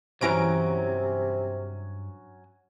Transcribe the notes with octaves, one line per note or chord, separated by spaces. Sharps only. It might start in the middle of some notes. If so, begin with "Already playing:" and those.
G2 C3 E3 F#3 C#4 A#5 D7